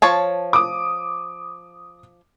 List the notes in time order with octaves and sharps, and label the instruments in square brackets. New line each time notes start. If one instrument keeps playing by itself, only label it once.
[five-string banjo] F3 C#5 A5
[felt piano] D6 D#6